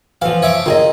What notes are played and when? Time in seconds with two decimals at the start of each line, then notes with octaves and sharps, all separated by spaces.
0.22 E3 F3 F5
0.42 C#5 E5 D6
0.66 D#3 F4 G#4 D#5